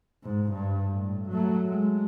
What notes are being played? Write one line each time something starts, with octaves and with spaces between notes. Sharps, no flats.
G#2
G2
A2
F#3 A3
G#3